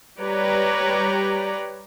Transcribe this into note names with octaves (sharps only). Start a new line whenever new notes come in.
G3 G4 B4 C#5 D5 A#5